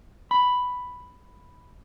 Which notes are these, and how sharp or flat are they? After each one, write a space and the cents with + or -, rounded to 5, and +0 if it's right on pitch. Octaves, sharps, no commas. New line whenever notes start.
B5 +5